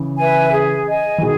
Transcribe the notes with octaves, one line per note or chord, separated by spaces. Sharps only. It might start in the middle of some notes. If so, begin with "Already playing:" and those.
Already playing: C#3 E3
B4 E5 G#5
G#4
D#5 G#5
E3
B2 D#3 G#4